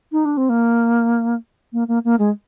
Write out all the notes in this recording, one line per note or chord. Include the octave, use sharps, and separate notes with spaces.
D#4
D4
C4
A#3
A#3
A#3
A#3
G#3